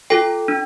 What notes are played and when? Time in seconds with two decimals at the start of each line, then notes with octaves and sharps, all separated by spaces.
0.10 F4 A4 G5
0.48 D4